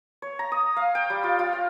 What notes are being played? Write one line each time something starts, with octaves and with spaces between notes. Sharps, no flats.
C#5
A#5
D#6
F5
G5
G3
F4
F4
F5